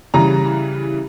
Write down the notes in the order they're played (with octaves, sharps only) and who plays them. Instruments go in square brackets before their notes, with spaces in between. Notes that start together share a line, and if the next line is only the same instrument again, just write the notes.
[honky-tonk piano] C#3 E3 G3 A#5